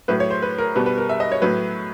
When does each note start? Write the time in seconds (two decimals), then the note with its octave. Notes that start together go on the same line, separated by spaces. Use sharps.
0.08 A2 F#3 B4
0.20 C#5
0.30 C5
0.42 B4
0.58 A#4
0.76 B2 G3 B4
0.86 B4
0.98 A#4
1.09 E5
1.20 D#5
1.32 C#5
1.42 A2 F#3 B4